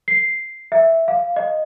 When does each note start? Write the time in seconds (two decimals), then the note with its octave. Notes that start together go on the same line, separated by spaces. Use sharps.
0.08 C7
0.72 E5
1.08 F5
1.36 D#5